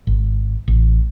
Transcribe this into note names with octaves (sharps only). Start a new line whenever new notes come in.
G#1
A1